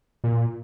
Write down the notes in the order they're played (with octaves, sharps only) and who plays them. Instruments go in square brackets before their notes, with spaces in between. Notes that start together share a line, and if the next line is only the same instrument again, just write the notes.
[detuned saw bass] A#2